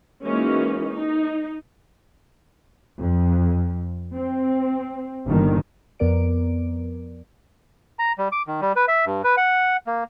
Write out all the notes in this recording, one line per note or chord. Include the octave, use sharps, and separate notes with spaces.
E3 G#3 A#3 C#4 D#4 F#4
D#4
F2
C4
G1 A#2 D#3
F2 B3 A#4 D5 D7
A#5
G3
D6
D#3
G3
B4
E5
G2
B4
F#5
A#3